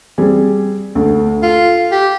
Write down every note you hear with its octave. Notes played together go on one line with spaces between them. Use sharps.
G3 C4 G#4
D2
F4 A4
G4